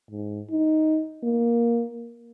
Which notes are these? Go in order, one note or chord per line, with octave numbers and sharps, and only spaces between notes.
G#2
D#4
A#3